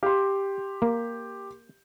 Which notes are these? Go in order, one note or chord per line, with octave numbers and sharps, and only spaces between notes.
G4 F5 C6
A#3